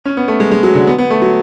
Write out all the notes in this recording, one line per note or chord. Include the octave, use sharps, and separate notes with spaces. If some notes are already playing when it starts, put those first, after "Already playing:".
C#4
B3
A3
G#3
G#3
F#3
D3
B3
B3
A3
F#3